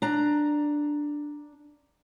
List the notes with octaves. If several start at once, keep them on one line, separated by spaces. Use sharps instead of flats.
D4 A#5